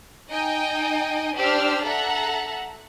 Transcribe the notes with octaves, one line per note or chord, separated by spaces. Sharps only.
D#4 D#5 G5 G#5
D4 G4 C5 E6 F6
A4 E5 F#5 A#5